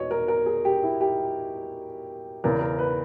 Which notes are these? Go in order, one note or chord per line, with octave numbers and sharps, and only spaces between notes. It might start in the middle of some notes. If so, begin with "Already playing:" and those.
Already playing: E2 B2 C#5 D#5
A#4
A#4
G#4
G4
E4
G4
E2 C#3 E3 A#4
A#4
B4